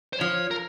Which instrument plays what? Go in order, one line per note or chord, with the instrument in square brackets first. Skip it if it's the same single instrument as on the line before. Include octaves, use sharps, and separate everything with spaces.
[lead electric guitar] C5
[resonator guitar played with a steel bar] F3 [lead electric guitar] C#5
[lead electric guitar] A#4